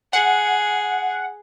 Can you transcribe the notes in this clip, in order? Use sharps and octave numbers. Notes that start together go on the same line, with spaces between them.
G#4 F#5